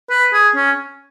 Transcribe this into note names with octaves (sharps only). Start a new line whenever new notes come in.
B4
G#4
C#4